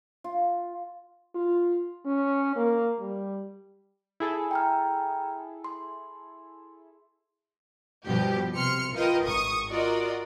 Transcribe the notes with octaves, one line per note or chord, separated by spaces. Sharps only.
F4
F4
C#4
A#3
G3
E4 G#4 A4
G5 A#5 F6
C6
G2 B2 F3 G4
C3 C6 F6 C#7
F4 A#4 B4 D#5 G5
G#1 C#6 D#6
F4 F#4 A#4 D5 D#5